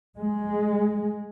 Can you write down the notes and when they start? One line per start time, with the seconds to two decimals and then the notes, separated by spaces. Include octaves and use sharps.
0.17 G#3